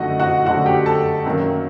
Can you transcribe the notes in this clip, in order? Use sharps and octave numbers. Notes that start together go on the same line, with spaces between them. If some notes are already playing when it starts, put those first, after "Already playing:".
Already playing: F#2 D3 A3 D#4 F#4 D#5 F#5
F#4 F#5
F#2 D3 A3 F#4 F#5
G4 G5
A4 A5
F#2 D#3 F#3 A#3